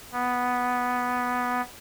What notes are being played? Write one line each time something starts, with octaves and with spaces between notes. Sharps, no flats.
B3